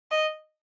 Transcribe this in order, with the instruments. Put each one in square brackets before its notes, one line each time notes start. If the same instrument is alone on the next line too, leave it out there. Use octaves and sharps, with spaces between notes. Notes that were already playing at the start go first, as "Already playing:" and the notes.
[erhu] D#5